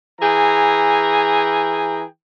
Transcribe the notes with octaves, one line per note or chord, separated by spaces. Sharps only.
E3 G#4 G5 A#5